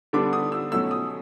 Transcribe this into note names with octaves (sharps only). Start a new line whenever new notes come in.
D3 G3 B3 D4 D6
D#6
E6
B2 F#3 A3 C#4 E6
D#6